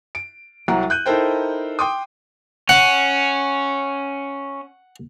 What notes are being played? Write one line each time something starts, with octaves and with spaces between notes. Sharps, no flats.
D7
C2 F#3 F#5 A#5
F#6 G6 D#7
D#4 E4 A4 A#4 C5 G5
G5 C6 D6 D#6
C#4 F#5